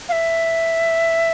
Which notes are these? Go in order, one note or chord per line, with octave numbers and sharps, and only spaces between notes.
F5
E5